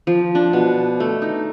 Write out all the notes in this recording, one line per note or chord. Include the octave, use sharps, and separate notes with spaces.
F3
D4
B2
A3
D#4